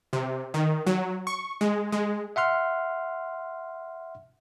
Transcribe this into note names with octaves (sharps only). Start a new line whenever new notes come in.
C3
D#3
F#3
C#6
G#3
G#3
E5 F#5 C6 F6